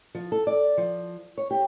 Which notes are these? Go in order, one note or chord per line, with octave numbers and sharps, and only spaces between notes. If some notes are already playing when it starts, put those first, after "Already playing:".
F3
A4
D5
F3
C#5
G4